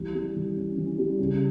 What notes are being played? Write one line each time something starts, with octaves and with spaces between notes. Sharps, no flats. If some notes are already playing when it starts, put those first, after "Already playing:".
Already playing: E3 G3
G3
E3
C#4
E3
G3
C#3